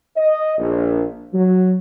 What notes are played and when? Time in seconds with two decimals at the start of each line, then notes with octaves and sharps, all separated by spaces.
0.17 D#5
0.58 A#1
1.33 F#3